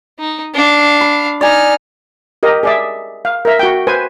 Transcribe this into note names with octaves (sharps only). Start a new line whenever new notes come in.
D#4
D4 F5
B5
D#4 D5 G#5 F6
G4 A#4 D#5
G#4 D5 E5
F5
A#4 E5
F#4 G5
B4 C5 G#5